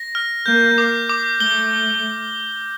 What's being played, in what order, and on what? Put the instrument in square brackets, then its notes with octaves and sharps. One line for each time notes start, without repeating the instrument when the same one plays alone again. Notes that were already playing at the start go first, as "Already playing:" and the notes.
Already playing: [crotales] A#6
F6
[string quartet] A#3 [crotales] G6
[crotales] D6
D6
[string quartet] A3 [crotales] G7